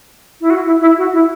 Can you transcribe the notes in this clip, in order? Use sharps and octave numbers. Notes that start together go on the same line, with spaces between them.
E4
F#4
E4
E4
F#4
E4